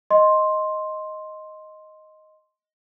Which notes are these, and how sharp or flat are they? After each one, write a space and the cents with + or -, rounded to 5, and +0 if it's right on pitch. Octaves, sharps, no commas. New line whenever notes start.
D#5 +0 C6 +5